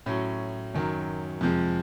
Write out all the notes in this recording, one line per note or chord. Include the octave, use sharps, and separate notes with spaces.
A2 F#3 C#4
F#2 D#3 F#3
F2 C3 F3 G#3